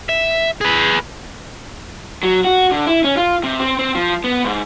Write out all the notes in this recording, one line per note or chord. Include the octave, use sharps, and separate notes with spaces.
E5
G#4 B4
F#3
F#4
D3
E4
C#4
F4
C3
C4
C4
F3
B3
G#2